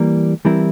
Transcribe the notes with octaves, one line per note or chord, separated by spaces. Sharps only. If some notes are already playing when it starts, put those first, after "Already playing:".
Already playing: E3 G3 A#3
E3 G3 C4 E4 A#4